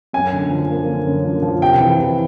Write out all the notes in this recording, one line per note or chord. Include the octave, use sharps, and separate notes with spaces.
F#2 G#5
D3
F3
A#3
D3
F#2
F3
F3
C3 G5
E3
E3